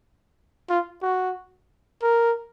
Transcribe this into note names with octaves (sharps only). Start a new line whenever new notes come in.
F4
F#4
A#4